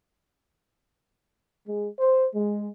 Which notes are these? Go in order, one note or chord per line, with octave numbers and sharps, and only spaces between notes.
G#3
C5
G#3